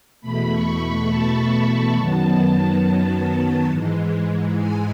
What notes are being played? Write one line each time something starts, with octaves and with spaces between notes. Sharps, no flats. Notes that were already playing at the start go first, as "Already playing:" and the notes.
E2 B2 A3 B5
C#6
B5
A5
F#2 D#3 F#3 B3
G#2 E3 G#3
G#5